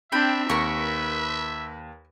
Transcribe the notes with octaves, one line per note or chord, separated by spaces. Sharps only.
C4 D4 E5 G5 B5
D#2 A#4 B4 C#6